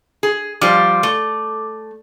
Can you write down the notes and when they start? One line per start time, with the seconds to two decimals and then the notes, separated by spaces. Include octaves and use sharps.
0.23 G#4
0.61 F3 G3 C5 D6
1.03 A3